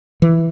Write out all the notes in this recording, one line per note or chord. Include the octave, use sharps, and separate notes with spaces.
E3